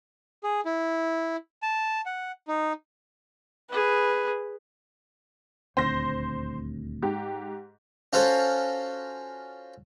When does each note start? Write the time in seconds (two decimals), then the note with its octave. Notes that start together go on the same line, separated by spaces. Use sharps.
0.44 G#4
0.65 E4
1.63 A5
2.06 F#5
2.48 D#4
3.72 G#4 B4
5.77 D#1 D2 C4 C5 A#6
7.02 G#2 G4
8.13 C#4 F4 F#4 A4 C5